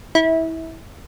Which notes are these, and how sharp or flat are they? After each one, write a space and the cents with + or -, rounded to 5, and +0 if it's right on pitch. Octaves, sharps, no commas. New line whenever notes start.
E4 -25